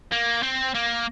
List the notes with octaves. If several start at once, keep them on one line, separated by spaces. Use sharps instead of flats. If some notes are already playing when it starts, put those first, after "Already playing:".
A#3
C4
A#3